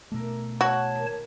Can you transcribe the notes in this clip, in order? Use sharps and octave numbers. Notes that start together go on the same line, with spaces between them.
B2 A3 D4 E4 A#4
F#4 C#5 A5
A#2 D#3 G3